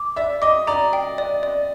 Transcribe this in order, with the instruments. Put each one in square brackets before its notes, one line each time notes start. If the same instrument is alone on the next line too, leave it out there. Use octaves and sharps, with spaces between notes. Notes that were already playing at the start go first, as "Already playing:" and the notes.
Already playing: [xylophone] D6
[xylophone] D5 [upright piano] E5
[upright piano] D#5 [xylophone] D6
[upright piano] D5 [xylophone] A#5
[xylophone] G5
D5
D5